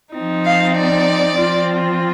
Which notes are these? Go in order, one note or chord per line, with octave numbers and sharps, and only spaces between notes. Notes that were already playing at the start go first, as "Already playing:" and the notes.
F3 C4 D#4
F5
D5
F3 C4 F4